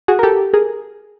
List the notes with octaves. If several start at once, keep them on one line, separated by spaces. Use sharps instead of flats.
F#4 G#4
A#4
G4 A4
G#4 A#4